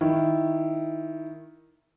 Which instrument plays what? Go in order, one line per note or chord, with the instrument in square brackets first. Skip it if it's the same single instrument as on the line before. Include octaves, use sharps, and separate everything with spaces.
[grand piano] D#3 E4